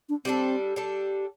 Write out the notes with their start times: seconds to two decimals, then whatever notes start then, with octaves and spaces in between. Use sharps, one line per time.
0.09 D4
0.25 G3 C4 D4 A4
0.76 G3 D4 A4